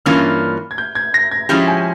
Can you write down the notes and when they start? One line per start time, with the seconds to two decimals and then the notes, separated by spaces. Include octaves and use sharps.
0.06 G2 E3 A#3 C#4 F4 F6
0.71 G#6
0.78 G6
0.95 G#6
1.14 A#6
1.31 G#6
1.49 F3 G#3 C#4 E4 G4 G6
1.67 G#5